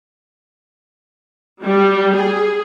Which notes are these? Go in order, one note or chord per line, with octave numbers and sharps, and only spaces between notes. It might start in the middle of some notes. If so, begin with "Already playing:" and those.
G3
G#4